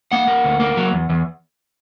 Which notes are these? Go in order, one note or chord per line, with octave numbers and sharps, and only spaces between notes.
A#3 F#5
A#3
D2
A#3
F#3
E2
E2